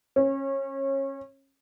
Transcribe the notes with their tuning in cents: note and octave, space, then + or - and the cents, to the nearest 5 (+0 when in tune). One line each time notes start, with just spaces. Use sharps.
C#4 -25